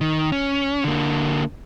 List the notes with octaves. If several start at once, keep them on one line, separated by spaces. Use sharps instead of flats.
D#3
C#4
D3 A#3